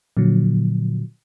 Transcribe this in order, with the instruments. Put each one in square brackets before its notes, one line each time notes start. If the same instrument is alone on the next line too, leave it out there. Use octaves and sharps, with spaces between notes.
[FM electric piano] A#2 D3 F3 F#3